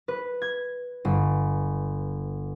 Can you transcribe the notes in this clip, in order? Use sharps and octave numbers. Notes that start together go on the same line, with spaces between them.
B4
G#6
G1